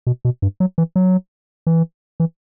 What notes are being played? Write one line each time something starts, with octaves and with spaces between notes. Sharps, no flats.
B2
B2
G2
F#3
E3
F#3
E3
E3